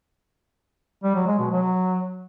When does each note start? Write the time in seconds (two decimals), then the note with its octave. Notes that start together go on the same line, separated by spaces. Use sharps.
1.04 G3
1.15 F#3
1.27 G#3
1.39 B2
1.50 F#3